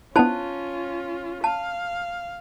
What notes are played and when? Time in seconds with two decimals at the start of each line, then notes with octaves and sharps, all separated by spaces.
0.16 B3 C#4 D4 E4 F4 C5 A5
1.44 F5 A5